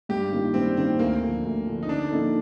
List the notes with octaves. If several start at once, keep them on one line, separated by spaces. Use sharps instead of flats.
G2 G4
D#3 A#3 F4
G2 C4
D#3 A#3 C4 F4
D2 A#3
D3 F3
D2
D3 F3
D#4
D3 D4
F3 A#3 D#4 A4